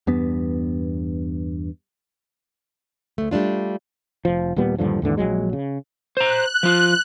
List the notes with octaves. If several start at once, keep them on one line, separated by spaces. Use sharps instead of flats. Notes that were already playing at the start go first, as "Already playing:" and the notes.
E2 G2 B3
D2 A3
G3 A3 D4 F4
F1 F3
D#1 A#2 G3 B3
D#1 G2 D3 F3
D#2 G#2 D3 E3
A#1 E2 F#3 G#3
C#3
C5 A#5 F#6
F3 F4